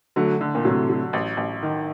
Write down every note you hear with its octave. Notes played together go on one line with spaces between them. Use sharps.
D3 F#3 A3
D3
A#2
A2 C3 F#3
F#3
A1
A1
D#3